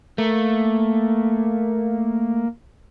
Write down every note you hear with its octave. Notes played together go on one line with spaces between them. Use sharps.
A3 A#3